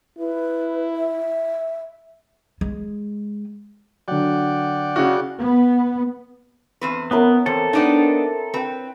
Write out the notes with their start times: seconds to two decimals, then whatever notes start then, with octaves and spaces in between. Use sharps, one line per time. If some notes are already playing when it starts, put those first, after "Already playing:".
0.19 E4 B4
0.96 E5
2.61 G#3
4.08 D3 F#3 D5 F#5 G5
4.96 C#3 E4 F#4
5.40 B3
6.81 E2 C4 B4
7.11 B3 C#4 E4 A#4
7.46 E2 C4 A4
7.73 B3 D4 D#4
8.54 C4 B4 G5